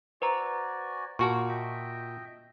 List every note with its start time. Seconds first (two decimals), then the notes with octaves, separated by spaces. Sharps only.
0.22 F#4 B4 C5 D5 G#5 A#5
1.19 A#2 F#4 F5 A5 C#6
1.49 D#5 E5 G5